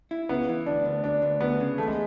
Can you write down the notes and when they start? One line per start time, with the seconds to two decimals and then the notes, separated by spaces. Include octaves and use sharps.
0.11 E4
0.29 C#3 B3
0.49 E3
0.66 D2 D4
0.85 D2
1.04 D2 D4
1.22 D2
1.41 D2 B3
1.60 C#3
1.78 E2 A3
1.87 G#3